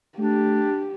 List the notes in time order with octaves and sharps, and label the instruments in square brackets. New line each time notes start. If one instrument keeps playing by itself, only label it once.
[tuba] A3 [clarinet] D4 [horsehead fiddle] G4